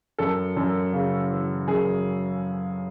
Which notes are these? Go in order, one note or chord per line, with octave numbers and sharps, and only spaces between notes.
F#2 A4
F#2
C#3
E3
F#2 G#4